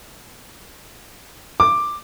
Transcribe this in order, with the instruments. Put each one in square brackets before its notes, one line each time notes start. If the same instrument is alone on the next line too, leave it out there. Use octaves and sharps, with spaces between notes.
[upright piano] D6